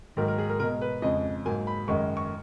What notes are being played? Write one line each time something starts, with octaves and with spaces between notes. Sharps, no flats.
G#2 D#3 F#3 A#3 A#4
A#4
G#4
A#4
B2 G#3 A#4
B4
F2 C#3 G#3 D#5
G#2 F#3 A#3 G#5
B5
F#2 D#3 G#3 C#6
C#6